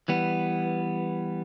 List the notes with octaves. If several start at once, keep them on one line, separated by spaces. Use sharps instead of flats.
E3 G3 B3